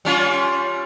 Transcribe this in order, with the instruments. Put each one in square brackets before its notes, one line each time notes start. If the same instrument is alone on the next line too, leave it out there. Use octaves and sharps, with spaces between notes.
[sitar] G3 C#4 F4